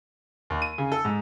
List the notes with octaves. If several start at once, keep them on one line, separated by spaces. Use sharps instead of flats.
D#2
D#7
C#3
A4
G#2